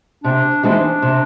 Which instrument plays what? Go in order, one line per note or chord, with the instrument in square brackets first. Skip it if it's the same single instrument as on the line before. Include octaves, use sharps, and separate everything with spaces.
[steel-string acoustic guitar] C3 [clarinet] D4
[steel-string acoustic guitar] E3 G#3 C4 D#4 [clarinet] D4
[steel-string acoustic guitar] C3